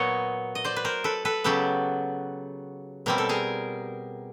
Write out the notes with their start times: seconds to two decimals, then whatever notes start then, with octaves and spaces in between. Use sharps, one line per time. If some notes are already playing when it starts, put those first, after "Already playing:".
Already playing: A#2 F#3 B3 C#5 D#5
0.55 D#5
0.65 C5 D5
0.76 B4
0.85 A#4 C5
1.04 A4 B4
1.25 A4 B4
1.44 C#3 F#3 B3 G4 A4
3.06 B2 G3 C4 A#4
3.18 A4
3.29 G#4 A#4